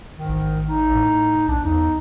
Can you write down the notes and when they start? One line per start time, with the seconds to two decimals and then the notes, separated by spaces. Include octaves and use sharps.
0.17 G#2 D#3
0.29 A1
0.68 D#4
0.95 A2
1.48 B1 D4
1.64 E2 D#4